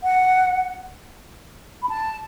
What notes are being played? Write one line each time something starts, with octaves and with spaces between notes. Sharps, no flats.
F#5
B5
A5